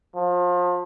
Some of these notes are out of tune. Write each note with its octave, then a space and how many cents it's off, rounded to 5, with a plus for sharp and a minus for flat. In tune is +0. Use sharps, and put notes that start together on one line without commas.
F3 +30